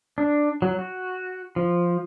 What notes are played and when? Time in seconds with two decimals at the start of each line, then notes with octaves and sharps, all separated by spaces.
0.18 D4
0.62 F#3
0.79 F#4
1.56 F3